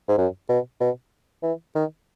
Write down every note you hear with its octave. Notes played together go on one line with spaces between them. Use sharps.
G#2
F#2
B2
B2
E3
D#3